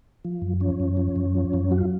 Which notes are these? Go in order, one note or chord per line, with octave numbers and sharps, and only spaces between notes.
F3
F#2
F3 C#4
F#2
F3
F#2
F3
F#2
F#3 F#4
F4